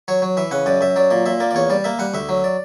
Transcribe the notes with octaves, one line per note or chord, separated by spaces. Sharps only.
F#3 C#5
F#3
E3 E5
C#3 F#5
F#2 D5
F#2 E5
F#3 D5
A#2 D5
A#2 E5
A#3 D5
D5
E2 C#5
G3 D5
A#3 E5
G3 F#5
D2 E5
F#3
D5